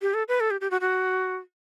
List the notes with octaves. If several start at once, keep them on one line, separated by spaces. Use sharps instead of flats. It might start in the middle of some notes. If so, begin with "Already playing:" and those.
G4
A4
B4
A4
G4
G4
F#4
F#4